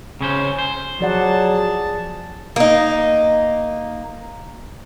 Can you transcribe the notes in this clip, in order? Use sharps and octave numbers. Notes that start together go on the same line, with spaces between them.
C#3 C#4 C5
C5
F3 F#3 G#4 D5 F#5 A5
A#3 D#4